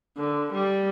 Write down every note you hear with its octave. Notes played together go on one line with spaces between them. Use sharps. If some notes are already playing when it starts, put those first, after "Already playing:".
D3
G3